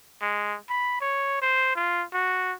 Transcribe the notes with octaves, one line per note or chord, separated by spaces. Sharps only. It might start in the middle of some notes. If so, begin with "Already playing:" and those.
G#3
B5
C#5
C5
F4
F#4